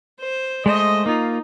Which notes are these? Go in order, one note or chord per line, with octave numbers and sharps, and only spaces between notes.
C5
G#3 A3 C5 D#5
A#3 D#4 F4